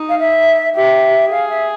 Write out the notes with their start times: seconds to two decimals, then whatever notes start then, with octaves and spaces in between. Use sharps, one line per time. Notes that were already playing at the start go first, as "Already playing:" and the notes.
Already playing: D#4
0.09 F5
0.19 E5
0.75 G4 E5
1.31 G#4 F5
1.50 E5